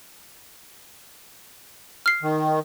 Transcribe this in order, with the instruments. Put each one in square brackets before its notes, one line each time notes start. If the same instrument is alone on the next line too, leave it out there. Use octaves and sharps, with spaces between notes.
[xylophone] F6 C7
[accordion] D#3